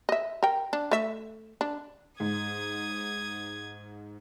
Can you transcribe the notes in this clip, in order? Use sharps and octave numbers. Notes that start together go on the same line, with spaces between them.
D#5 E5
A#4 G5
D4
A3 E5
D4
G#2 D#6 G#6